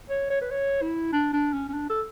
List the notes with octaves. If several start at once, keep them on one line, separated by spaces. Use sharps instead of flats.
C#5
C#5
B4
C#5
E4
D4
D4
C#4
C#4
D4
A4